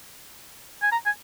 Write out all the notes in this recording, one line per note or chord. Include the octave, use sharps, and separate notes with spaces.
G#5
A#5
G#5